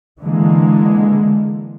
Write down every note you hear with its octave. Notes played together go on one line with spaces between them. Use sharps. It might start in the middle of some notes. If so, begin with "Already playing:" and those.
D3 E3 G#3 A#3